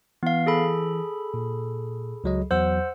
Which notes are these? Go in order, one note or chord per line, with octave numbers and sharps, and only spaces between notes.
E3 B3 F5
G#4 A4 B5
A#2
C#2 F#3 D#5
E2 F#3 C5 F#5 E6